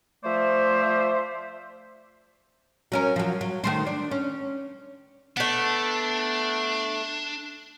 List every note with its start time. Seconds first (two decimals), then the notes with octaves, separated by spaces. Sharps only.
0.24 F3 A3 C5 D5 E5
2.92 F#3 C#4 A#4
3.16 F3 F#3
3.41 F#3
3.64 D#3 A3 C5
3.86 D4
4.11 C#4
5.37 A3 B3 D4